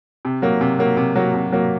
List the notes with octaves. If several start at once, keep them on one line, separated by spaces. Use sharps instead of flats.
C3
F#3 A#3
C3
F#3 A#3
C3
F#3 A#3
C3
F#3 A#3